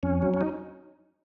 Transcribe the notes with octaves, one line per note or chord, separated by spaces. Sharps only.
F2 C#4
F#3
C#4
D#4